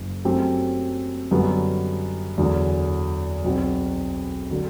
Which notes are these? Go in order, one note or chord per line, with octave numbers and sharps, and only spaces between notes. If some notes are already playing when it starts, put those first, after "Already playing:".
Already playing: F#1 F#2
F#2 F#3 A3 C4 G4
F#2 D3 G3 B3 F#4
E2 D3 F#3
B1 B2 F#3 C4 F#4
D3 F#3